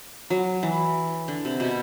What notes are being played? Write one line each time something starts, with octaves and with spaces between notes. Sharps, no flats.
F#3
E3
D3
C3
B2